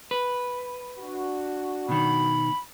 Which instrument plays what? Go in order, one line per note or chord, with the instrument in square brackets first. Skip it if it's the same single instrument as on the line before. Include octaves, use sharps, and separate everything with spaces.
[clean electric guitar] B4
[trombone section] D4 F#4
[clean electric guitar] B2 D#3 [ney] B5